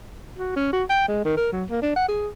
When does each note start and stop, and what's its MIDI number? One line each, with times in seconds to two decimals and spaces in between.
0.39 0.54 66
0.56 0.72 61
0.73 0.83 66
0.89 1.04 79
1.08 1.20 56
1.25 1.36 51
1.37 1.50 70
1.52 1.64 54
1.70 1.80 58
1.82 1.94 62
1.96 2.08 78
2.08 2.28 68